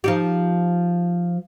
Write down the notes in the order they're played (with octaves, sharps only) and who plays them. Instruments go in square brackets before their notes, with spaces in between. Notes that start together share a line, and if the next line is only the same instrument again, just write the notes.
[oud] F3 D#4 G4